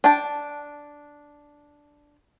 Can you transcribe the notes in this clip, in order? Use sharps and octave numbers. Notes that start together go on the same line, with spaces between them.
D4 G5 A5